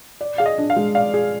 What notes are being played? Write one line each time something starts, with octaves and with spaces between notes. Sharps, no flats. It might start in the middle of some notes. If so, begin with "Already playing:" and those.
D5
G#4 F5
D#5
D4
F5
G#3
D5 F5
G#4